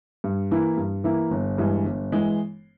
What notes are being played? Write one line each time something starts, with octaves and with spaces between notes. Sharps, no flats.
G2
E3 A#3 E4
G2
E3 A#3 E4
G1
G2 E3 G#3
G1
E3 G#3